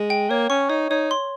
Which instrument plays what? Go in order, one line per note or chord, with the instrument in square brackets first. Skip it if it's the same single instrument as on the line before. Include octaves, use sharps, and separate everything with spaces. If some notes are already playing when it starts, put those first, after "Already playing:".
Already playing: [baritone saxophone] G#3
[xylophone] G5
[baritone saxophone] A#3 [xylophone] C#5
[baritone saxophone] C#4 [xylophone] C#6
[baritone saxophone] D#4 [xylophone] C#5
[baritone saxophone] D#4 [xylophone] C#5
[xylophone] C6